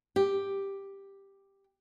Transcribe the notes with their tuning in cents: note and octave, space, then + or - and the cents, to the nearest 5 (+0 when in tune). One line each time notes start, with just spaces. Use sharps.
G4 +5